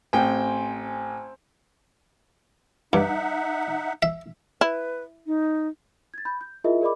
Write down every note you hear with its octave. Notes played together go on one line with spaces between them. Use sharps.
A1 C4 C5 G5 G#5
G2 D#4 E5 F#5
E5
E4 B4
D#4
G#6 A6
B5 G6
G6
E4 F4 G#4 A#4 D#5 E5
G#4 A#4 D5 D#5 B5 D6